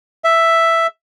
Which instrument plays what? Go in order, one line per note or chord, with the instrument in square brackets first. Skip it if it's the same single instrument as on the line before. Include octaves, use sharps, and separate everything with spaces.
[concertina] E5